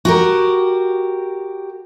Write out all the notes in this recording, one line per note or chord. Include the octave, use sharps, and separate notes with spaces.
F#4 G4 A#4